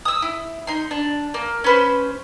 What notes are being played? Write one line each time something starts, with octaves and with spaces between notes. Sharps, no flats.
D#6 E6
E4
D#4 C6
D4
A#3
C#4 B4 C5